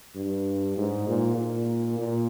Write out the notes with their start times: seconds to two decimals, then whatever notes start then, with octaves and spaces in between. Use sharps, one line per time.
0.16 G2
0.77 G#2
1.08 A#2
1.37 A#2
1.99 A#2